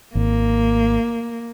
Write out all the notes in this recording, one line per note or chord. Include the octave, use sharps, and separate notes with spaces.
G#1 A#3